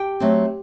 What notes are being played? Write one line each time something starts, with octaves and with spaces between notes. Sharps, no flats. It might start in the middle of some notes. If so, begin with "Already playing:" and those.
Already playing: G4 G5
F#3 A3 C4